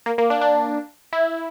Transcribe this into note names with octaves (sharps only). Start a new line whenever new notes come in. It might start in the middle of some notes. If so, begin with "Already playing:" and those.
A#3
A#3
D4
D4
E4